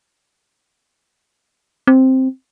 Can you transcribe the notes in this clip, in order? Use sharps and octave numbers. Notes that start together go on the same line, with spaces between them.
C4